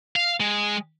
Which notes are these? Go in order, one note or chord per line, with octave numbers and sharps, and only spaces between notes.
F5
G#3